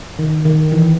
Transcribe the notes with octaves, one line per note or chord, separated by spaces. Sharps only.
D#3
D#3
E3